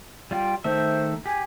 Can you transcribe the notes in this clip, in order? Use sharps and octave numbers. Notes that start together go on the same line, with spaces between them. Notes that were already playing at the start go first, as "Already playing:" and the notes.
G3 F4 G5
D#3 A3 C5 E5
G4 G#5